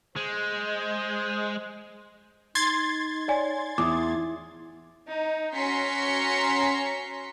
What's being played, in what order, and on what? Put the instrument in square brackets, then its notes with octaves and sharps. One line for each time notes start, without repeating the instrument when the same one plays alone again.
[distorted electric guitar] G#3 [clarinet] C5
[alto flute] D#4 [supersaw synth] C6 G#6 A6
[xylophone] C#5 D5 G#5
[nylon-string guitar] E2 [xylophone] D6 D#6
[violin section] D#4
C#4 F#4 A#5 C6 B6 C#7